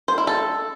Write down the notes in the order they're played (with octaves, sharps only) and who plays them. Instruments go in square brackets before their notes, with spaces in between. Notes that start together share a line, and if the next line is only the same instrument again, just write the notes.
[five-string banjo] C5
E4
A4